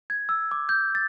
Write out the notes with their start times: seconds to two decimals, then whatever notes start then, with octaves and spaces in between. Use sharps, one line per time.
0.10 G#6
0.29 E6
0.51 D6
0.69 G6
0.95 A6